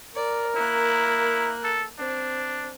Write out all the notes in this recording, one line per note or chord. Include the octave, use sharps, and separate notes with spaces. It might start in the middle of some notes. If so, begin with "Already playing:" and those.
A#4 D5
A#3 E4 F#6
A4
C4 D4